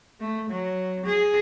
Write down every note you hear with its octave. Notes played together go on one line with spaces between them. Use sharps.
A3
F#3
G#4